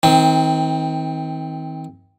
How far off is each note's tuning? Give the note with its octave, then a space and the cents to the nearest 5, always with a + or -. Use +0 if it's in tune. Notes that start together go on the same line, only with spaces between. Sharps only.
D#3 +35 C4 +0